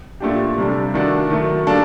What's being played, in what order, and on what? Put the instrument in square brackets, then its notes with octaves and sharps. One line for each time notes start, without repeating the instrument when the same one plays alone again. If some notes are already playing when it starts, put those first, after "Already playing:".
[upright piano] A#2 A3 D4 G4
C3 G3 D4 A4
D#3 A3 D4 F#4 A4
D#3 F#3 A3
G3 A#3 D4 A4